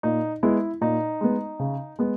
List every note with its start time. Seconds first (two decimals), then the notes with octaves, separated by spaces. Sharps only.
0.03 A#2 D#4
0.43 G#3 B3 E4
0.81 A#2 D#4
1.21 G#3 B3
1.59 C#3
1.99 G#3 B3